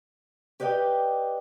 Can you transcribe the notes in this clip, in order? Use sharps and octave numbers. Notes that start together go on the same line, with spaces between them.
G4 B4 D5 D#5 G5